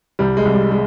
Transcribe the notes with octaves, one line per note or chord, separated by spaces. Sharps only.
C2 G3
G#3
C2
G3
G#3